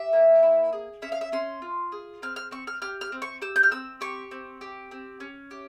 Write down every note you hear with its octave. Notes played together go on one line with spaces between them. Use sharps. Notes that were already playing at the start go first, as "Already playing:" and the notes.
Already playing: G4 E5
A#3
E4
G#4
C#4 E5
F5
E5
C#4 C6
F4
G#4
C4 F6
F6
C4 C#6
F6
G4 F6
F6
C4
C#6
G4 E6
G6
F6
C4 E6
G4 C#6
C4
G4
C4
C#4
G4